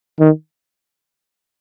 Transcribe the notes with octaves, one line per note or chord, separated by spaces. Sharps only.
D#3